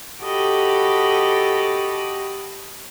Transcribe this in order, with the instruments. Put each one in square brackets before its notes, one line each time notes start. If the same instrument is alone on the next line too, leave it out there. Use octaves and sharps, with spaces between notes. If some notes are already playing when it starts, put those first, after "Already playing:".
[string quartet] F#4 G4 A4 D#5 B5 D6